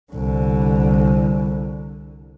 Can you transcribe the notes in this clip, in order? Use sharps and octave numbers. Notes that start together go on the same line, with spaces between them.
C2 D3